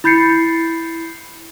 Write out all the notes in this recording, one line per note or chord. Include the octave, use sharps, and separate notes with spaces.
E4 B5 G6 A6 C7 C#7